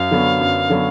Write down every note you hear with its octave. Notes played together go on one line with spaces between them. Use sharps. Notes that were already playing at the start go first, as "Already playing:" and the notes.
Already playing: F#2 F5
D3 F#3 B3
F#2
D3 F#3 B3